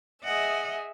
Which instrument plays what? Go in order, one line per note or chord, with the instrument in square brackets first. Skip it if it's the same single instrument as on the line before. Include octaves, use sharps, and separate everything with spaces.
[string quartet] G#4 E5 [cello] D#5 F#5